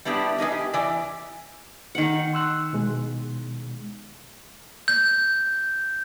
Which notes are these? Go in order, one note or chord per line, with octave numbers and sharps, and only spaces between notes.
G3 B3 D4 E4 G4
E3 D4 D#4 A#4
G4
E3 D5
D#3 F#5
C6 E6 F#6
B2 G#3
G6